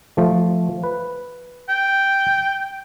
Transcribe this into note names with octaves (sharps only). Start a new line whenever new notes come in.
F3 A3
B4
G5